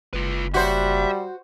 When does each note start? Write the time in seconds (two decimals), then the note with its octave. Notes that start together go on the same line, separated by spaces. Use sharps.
0.13 F#1 F4 B4
0.54 G3 F#4 C5 E5